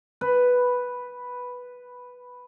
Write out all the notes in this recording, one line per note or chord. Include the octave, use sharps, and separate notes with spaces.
B4 B5